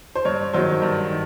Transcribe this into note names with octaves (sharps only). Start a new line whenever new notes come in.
C5
G2 C#5
D#3 F#3 C5
G2
D#3